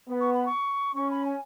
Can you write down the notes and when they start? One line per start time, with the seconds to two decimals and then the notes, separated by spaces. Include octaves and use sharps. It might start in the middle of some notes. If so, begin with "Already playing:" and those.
0.09 B3
0.20 C#6
0.33 B5
0.46 C#6
0.96 C#4 C#6
1.10 B5
1.25 G#5